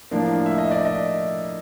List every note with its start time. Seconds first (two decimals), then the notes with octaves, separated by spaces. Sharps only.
0.11 A2 F3 A#3 D4
0.46 E5
0.58 D#5
0.71 D5
0.85 D#5